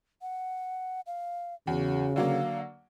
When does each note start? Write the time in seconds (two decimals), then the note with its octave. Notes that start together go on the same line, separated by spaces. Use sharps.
0.22 F#5
1.07 F5
1.67 E2 C#3 F#4
2.16 D3 F#3 A#3 F5